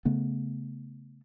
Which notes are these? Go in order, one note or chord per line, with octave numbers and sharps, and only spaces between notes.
C#3 A3 B3